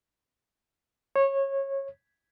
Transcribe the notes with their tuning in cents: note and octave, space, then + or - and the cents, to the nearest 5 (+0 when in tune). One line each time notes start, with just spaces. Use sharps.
C#5 -20